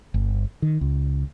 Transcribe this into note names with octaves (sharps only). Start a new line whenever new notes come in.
G1
D#3
C#2